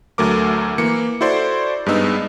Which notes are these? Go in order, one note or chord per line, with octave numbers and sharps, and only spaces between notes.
D2 F#3 A3 A#4 D6
E3 A#3 C#7
E4 F#4 A4 C5 D5 C6
G2 G#3 B3 D#4 E6